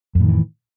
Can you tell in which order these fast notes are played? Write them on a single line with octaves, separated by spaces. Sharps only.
F2 A2 D#3 E3